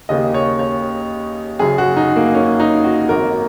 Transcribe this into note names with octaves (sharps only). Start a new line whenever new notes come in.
D#2 C#3 A#3 D#5
C#5
C#5
F#1 F#2 C#3 G#4
F#4
D#4
A#3
C#4
D#4
F#4
G#1 F#2 F#3 A#3 A#4